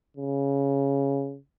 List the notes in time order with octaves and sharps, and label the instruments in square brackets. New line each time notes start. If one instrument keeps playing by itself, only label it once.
[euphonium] C#3